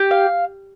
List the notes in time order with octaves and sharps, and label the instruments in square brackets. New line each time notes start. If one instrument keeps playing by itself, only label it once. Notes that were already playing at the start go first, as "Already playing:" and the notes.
Already playing: [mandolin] G4
F5